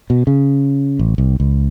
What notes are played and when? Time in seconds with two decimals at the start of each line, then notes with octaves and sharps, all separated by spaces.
0.10 B2
0.27 C#3
0.99 A1
1.18 C2
1.40 C#2